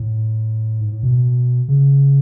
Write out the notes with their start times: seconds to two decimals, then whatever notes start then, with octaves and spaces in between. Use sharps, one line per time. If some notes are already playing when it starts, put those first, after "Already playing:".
Already playing: A2
0.81 G#2
0.92 A2
1.03 B2
1.68 C#3